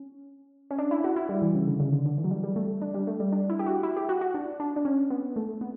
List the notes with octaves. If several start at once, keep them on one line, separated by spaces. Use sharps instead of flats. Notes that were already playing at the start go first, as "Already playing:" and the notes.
Already playing: C#4
C#4
D4
E4
F#4
E4
G3
E3
C#3
D3
C#3
D3
D3
E3
F#3
G3
G3
A3
D4
G3
A3
G3
D4
E4
G4
F#4
E4
G4
F#4
F#4
D4
D4
D4
C#4
B3
A3
B3